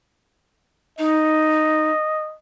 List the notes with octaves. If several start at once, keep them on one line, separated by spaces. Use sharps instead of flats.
D#4 D#5